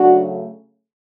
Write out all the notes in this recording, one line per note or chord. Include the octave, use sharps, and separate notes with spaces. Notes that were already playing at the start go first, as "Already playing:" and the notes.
Already playing: C#3 F#3 A3 D4 F#4